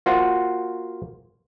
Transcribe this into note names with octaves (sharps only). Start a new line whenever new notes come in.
A#3 F4 F#4 C5 F#5